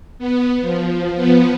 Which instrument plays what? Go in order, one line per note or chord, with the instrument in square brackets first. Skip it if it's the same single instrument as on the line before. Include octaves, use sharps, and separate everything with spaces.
[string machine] B3
F3
F3 B3